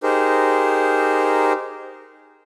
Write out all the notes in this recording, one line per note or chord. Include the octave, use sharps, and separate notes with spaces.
D#4 G4 G#4 A#4 C5